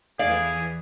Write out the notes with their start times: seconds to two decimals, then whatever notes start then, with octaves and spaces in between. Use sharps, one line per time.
0.19 E2 E3 G#4 D5 F5